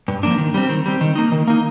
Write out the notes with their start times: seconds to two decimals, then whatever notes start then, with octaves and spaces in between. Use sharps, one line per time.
0.08 G2
0.23 F3 A#3 D4
0.38 D#3
0.54 G3 C4
0.69 D#3
0.86 G3 C4
1.01 D#3
1.15 A#3 D#4
1.32 D#3
1.47 A#3 D#4